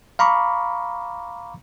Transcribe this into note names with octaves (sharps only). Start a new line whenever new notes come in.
F5 A#5 B5 C#6 D6